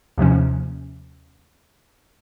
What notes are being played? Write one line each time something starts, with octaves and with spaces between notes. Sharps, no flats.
D#2 C3 F3 C#4